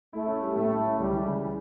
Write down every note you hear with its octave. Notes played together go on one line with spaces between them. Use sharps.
A3 E4
C#4
G3
A2 A3
E4
C#4
C#2 G3
E3
C#3